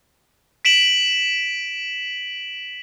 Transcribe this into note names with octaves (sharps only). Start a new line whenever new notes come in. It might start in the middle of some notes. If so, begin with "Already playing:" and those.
B6 D7 E7 F#7